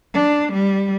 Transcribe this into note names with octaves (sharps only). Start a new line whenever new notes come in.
D4
G3